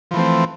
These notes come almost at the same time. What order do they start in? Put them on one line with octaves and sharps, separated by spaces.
F3 E3 A3 C4